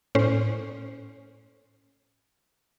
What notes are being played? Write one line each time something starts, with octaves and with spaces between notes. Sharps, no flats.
A2 C#4 C5